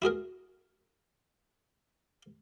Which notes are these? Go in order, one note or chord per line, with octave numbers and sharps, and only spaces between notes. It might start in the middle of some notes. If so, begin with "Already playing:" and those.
E4 F#4 G#4 A#4